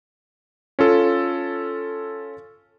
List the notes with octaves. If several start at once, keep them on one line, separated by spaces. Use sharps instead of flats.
C#4 F4 A4